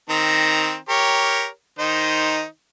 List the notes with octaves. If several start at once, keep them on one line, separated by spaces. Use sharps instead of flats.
D#3 C4 A#5
G4 A#4 C#5
D#3 D#4 C5